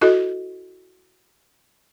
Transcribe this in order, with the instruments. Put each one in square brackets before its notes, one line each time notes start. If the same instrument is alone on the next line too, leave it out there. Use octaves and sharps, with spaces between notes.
[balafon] E4 F#4 A4 D#5